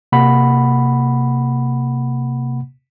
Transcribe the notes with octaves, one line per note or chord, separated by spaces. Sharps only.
C3 A#3 F#5 B5